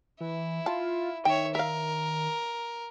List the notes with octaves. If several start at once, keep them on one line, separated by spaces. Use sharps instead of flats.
E3 E4
F4 A5
D#3 C#5 E5 G5
A#4 E5 F5